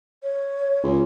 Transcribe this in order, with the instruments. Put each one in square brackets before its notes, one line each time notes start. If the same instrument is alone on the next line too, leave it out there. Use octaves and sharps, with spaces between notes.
[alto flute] C#5
[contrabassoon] C#2